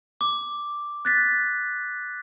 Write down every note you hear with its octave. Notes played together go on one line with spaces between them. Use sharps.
D6
F#6 A6 B6